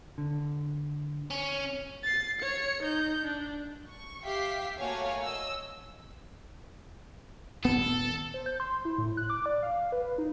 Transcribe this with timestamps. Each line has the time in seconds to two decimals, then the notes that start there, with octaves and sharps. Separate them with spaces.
0.18 D3
1.31 C#4
2.03 A6 C7
2.41 C#5 C#7
2.83 D#4 G6
3.25 D4
3.89 C#6
4.24 G4 E5 F5 G5 B6 C7
4.79 A3 A#3 F#4 C#5 F5 G#5
5.25 D#5 E6
7.65 D#1 G2 B3 A4
8.34 C5
8.46 G6
8.60 C6
8.85 E4
8.98 A2
9.17 F#6
9.30 D6
9.46 D5
9.63 F5
9.92 B4
10.18 D#4